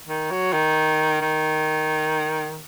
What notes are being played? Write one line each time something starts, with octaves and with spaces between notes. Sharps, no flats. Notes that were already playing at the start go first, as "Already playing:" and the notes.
D#3
F#3
D#3
D#3